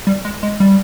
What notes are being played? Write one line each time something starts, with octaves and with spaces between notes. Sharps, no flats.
G3
G#3
G#3
G3